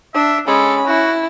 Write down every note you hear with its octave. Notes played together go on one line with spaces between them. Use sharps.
D4 E5
G#3 C#4 A4 B5
E4 F#4